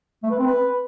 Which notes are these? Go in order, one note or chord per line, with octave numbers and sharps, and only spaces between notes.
A3
B4
C4
B4